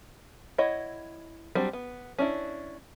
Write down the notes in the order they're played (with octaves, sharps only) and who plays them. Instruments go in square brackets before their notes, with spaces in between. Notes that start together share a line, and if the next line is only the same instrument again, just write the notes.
[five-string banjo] E4 C#5 D#5 F#5
F#3 G3 C4 D4 F#4
B3
C#4 D4 E4